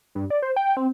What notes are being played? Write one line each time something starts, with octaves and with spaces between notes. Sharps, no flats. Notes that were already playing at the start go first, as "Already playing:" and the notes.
G2
D5
C5
G5
C4